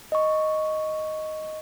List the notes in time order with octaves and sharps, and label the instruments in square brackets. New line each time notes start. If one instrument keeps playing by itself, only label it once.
[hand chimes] D#5 C#6